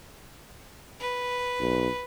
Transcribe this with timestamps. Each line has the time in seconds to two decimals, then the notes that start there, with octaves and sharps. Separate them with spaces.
1.00 B4
1.60 B1